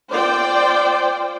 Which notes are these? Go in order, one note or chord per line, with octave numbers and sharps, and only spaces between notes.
F4 C5 D5 G5